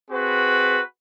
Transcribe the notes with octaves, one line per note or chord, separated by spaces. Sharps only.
C4 F#4 G#4 B4